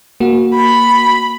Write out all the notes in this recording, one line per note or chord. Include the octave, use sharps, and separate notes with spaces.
A#3 F#4
B5